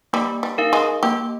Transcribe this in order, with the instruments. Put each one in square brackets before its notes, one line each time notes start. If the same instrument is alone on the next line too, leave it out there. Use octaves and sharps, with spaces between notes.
[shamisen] G3 [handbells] A#3
[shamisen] G3
[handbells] D#4 A#4 F5
[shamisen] G#3
[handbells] A#3 [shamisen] G4